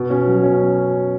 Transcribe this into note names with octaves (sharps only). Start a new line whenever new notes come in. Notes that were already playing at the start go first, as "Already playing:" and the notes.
Already playing: B2
C#4
F#3
C#4